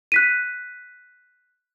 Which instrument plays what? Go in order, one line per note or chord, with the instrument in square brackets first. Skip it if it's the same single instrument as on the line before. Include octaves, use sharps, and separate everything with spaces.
[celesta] F#6 B6 D#7